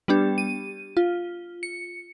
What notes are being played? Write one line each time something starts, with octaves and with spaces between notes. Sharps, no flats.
G3 B3 D4 G4
D#7
F4
C#7